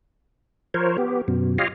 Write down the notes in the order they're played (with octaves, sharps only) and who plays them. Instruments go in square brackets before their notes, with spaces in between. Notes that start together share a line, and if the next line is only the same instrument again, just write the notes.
[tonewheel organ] F3 A#4 C5 C#5
B3 G4
F#2 B2
F4 G4 C#5 D#5 F5